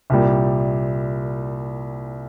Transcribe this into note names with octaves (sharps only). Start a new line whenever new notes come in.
C2 A#2 G3